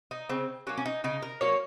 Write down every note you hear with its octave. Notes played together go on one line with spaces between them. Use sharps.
D#4
C#3 C4
F#3 A#3 C#4
C#4
D#4
C#3 D#4
A#4
F#3 A#3 C#5